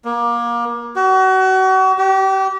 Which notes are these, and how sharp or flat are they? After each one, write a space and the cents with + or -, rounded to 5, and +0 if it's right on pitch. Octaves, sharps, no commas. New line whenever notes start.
A#3 +25
F#4 +35
G4 -30